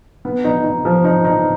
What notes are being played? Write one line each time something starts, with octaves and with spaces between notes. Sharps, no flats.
B3
D#4
D#4
F3
D#4
D#4